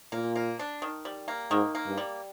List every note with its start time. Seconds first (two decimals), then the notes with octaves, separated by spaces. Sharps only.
0.12 A#2 A#3
0.36 A#3
0.59 D4
0.82 D#3
1.05 G3
1.28 A#3
1.51 G#2 D#3
1.75 A#3
1.86 G2
1.97 G3